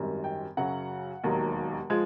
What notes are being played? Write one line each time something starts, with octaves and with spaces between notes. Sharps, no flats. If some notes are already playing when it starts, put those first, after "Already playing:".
Already playing: G#1 F#2 D#3 G3
G5
F#2 C#3 F#3 F#5
E1 D#2 D#3 F#3
F3 G#3